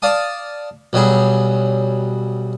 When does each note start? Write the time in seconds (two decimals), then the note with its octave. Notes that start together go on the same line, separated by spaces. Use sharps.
0.02 D5 F5 A5 D#6
0.93 B1 F#3 G3 G#4